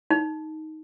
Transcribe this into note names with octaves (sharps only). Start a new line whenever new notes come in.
D#4